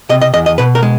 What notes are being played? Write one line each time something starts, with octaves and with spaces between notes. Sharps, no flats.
C3 D#5
D#5
E2 D#5
D#5
B2 B4
A#4
G#3